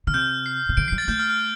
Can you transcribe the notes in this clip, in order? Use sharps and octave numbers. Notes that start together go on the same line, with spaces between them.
D3 F6
C3 G6
C7
C3
D3 D7
G3 C7
A6
A3 G6
F6
F6